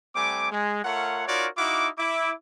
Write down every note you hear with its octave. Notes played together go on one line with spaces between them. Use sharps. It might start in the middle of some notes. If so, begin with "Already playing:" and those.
G3 A3 C4 G#5 D6
G#3
A3 F4 A#4 C#5 F#5
D#4 F4 F#4 A#4 C#5 D5
D#4 E4 F#4 F5 D6
E4 D6